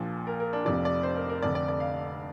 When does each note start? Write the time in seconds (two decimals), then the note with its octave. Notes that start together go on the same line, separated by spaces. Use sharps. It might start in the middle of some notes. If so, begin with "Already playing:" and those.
Already playing: A#1 A#2 F3
0.27 A#4
0.40 A#4
0.53 D4
0.65 F1 F2 C3 F3 D5
0.85 D5
1.03 C5
1.16 A#4
1.29 A#4
1.42 F1 F2 D3 D5
1.55 D5
1.68 D5
1.80 F5